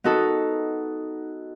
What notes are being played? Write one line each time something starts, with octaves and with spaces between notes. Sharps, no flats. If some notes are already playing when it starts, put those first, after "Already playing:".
B3 D#4 F#4 A4